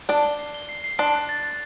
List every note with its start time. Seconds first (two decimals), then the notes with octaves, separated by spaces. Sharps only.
0.09 D4 D5 G7
0.23 G7
0.39 C7
0.54 G7
0.69 C7
0.84 C7
0.99 D4 D5 C6
1.14 F#6
1.29 A6
1.43 C6